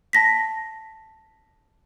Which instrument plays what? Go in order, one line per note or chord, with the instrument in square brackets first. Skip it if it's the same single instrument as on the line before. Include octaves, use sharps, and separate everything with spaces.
[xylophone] A5 A#6 B6